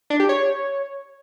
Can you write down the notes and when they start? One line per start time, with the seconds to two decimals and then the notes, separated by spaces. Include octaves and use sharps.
0.10 D4
0.20 G4
0.29 C#5